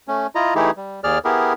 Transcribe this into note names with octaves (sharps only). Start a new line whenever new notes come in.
A3 C#4
E4 F4 D#5 A#5
E3 A3 D#4 E4 G4 G#4
G3
D#2 G#4 D5 F6
B3 E4 G4 G#4 A#4